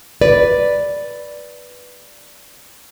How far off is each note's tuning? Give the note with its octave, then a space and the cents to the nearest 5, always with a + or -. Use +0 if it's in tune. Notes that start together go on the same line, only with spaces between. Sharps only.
B4 +0 D5 +0